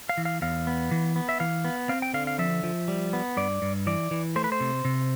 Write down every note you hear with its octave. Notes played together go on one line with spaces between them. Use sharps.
F5
E3
F5
E2 F5
B3
E3
B3
E5
E3 F5
B3
C4 F5
G5
D3 F5
F5
F3 E5
F3
G3
B3
G2 D5
G2
E3 D5
E3
A3 C5
B4
C5
C3
C3